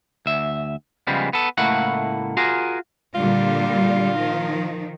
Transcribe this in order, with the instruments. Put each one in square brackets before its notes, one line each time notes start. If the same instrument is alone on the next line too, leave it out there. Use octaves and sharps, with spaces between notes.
[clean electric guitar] D2 E5
C#3 F3 G3 G#3 B3
B3 A4
C#2 A2 A3 A#3 E4 F#5
F4 F#4 G#4 A#4
[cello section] A#2 D3 G3 [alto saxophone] F4
[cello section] D#3 F3